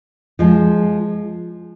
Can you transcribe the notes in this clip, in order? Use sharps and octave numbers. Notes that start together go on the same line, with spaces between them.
F3 G#3